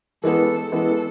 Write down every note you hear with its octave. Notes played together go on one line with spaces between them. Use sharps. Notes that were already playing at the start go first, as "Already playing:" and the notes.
E3 G#3 B3 A4
E3 G#3 B3 A4